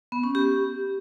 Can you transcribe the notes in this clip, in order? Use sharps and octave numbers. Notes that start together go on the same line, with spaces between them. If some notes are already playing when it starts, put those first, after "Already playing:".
B3
C#4
G4